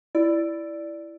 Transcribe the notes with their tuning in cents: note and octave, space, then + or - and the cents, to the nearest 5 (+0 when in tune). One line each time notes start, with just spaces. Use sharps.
E4 +10 D5 +0